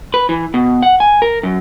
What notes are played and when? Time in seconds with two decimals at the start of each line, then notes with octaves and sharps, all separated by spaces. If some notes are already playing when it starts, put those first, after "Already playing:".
0.14 B4
0.29 E3
0.54 B2
0.82 F#5
1.00 G#5
1.22 A#4
1.43 F#2